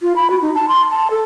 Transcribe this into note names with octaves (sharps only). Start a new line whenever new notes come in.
F4
B5
F#4
D#4
A5
C6
A5
A4